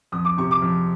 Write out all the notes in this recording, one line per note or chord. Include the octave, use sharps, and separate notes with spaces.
F2 D#6
D6
C3 F3 C#6
D6
F2